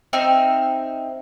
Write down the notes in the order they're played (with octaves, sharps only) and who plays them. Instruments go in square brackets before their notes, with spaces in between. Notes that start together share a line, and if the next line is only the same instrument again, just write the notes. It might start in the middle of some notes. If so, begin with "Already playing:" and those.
[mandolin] C4 D#4 E5 F6